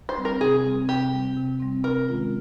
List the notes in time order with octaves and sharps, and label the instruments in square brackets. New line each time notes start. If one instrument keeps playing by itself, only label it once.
[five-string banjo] C5
[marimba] G3 C4
[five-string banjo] A#4
[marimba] C3 [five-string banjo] G#4
[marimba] G3 C4
[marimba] C3 [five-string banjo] G4
[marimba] G3 C4
C3
G3 C4
[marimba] C3 [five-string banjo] A#4
[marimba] D#3 G#3 C#4 F4